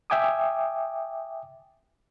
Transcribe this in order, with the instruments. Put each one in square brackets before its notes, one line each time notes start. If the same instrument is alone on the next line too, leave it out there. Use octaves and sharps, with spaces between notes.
[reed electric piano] E5 G5 G#5 D6 D#6